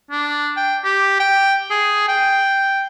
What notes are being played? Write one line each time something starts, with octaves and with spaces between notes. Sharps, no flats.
D4
G5
G4
G5
G#4
G5